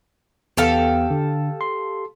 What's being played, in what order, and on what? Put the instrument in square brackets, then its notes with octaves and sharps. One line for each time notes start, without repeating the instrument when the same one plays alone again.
[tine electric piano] E2 B3 [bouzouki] G4 A4 F5
[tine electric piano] D3
C6